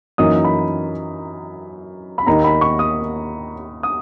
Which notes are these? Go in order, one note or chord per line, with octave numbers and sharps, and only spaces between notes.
F#2 E3 A#3 D#4 D#6
B5
B5
D#2 D#3 A#3 D#4 A#5
B5
C#6
D#6
D#6